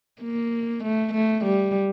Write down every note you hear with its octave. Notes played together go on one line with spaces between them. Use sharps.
A#3
A3
A3
G3